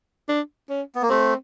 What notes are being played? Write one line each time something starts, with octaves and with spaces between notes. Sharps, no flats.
D4
C#4
B3
A#3
A3 C4